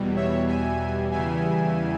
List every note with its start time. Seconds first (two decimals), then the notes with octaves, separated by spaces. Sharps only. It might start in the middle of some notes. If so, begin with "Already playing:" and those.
Already playing: E2 B2 G3
0.16 C#5 E5
0.48 E5 G#5
1.11 E2 C#3 E3 G3 E5 G#5